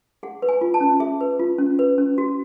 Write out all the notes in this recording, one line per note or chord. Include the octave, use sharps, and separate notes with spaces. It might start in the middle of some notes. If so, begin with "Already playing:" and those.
G#4 F#5
B4
G#5
F4
A5
C#4
G#4 E5
B4
F4
C#4
B4
C#4
F#4